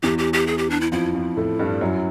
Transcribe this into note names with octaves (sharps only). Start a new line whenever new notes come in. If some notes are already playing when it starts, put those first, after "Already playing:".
E2 E3 G4
G4
G4
G#4
G4
D4
E4
F2 F3 E4
F2 F3
A2 A3
G2 G3
F#2 F#3